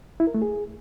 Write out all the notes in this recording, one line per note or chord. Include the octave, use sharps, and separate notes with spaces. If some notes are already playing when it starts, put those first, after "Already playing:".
E4
A#4
A3
G#4